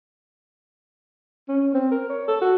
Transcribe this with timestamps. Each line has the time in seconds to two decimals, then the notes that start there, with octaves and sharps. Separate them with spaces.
1.48 C#4
1.74 C4
1.91 A#4
2.09 C#5
2.28 A4
2.41 F#4